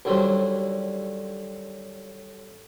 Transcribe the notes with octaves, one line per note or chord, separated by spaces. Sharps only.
D#2 D3 F#3 G3 C#4 C5